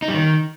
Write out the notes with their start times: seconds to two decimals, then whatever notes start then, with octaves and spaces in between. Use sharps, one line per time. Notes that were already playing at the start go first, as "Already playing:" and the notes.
0.02 D#4
0.08 G3
0.14 D#3